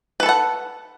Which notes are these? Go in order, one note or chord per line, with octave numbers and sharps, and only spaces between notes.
A4 B4 F#5 A5